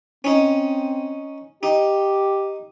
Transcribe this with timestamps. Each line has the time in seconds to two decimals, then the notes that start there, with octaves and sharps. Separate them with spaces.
0.24 C4 C#4 D#4
1.63 D#4 G4